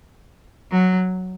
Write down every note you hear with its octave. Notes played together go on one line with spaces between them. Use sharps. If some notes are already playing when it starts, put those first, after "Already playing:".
F#3